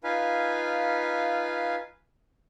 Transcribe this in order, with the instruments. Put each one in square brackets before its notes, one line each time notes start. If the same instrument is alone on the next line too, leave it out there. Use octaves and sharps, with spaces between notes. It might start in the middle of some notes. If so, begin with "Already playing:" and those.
[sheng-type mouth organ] D#4 F4 B4 F5 G#5